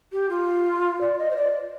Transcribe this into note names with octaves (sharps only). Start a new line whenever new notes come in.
G4
F4
D5
D#5
C5
D5